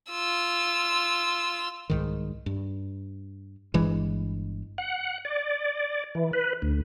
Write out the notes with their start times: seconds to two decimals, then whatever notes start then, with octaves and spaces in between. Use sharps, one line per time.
0.12 F4 E6
1.90 C2 G#2 D#3
2.46 G2
3.74 G1 G2 E3 G#3
4.78 F#5
5.25 D5
6.15 E3
6.33 B4
6.62 D2